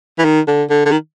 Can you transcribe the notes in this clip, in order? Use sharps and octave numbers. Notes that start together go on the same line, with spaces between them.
E3
D#3
D3
D3
D3
D#3